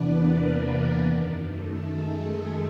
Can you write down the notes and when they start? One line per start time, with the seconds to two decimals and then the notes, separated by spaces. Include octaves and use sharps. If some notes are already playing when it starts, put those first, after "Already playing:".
Already playing: E2 C3 E3 B3 D4 B4 D5
0.09 A#3 A#4
1.01 F#2 D#3
1.45 A3 A4
1.91 G#3 G#4